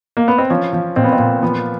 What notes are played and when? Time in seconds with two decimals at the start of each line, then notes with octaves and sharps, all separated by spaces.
0.17 A#3
0.28 B3
0.38 C4
0.50 F3 C#4
0.73 F3
0.96 A#2 C4
1.04 B3
1.13 C4
1.19 A#2
1.42 F3 B3